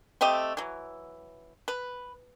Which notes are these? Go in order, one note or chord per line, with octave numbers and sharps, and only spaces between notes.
A3 C4 G4 D#5
E3 F#3
B4